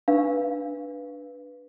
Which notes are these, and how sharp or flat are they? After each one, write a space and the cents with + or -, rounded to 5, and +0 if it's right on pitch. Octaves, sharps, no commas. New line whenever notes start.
D4 +0 B4 +0 F5 -10